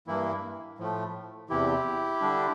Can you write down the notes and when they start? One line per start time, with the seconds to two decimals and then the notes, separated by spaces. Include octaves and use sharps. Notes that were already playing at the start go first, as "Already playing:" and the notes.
0.07 G2 E3 A#3 E4
0.78 A2 F3 A3
1.49 E2 C3 E3 E4 G4
2.21 D3 G3 D4